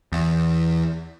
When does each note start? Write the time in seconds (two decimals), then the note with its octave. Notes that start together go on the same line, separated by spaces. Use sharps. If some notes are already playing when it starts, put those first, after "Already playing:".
0.12 E2